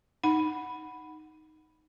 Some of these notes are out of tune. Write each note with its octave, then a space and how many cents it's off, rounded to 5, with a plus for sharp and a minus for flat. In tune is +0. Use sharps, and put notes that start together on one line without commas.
D#4 +0 F#5 +0 B5 +0